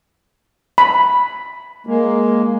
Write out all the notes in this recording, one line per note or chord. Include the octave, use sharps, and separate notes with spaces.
B5
G#3 A#3